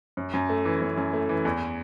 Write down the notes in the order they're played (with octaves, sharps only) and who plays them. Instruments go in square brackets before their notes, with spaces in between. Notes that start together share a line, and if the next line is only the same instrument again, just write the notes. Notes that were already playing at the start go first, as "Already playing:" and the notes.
[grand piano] F#2
F#2
A3
E3
F#2
F#2
A3
E3
E2